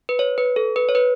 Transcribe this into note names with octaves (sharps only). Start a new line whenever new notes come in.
B4
C#5
B4
A4
B4
C#5
B4